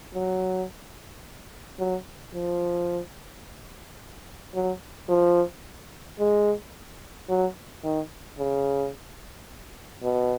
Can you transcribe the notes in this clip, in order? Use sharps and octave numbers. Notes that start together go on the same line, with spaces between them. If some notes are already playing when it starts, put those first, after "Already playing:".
F#3
F#3
F3
F#3
F3
G#3
F#3
D#3
C#3
B2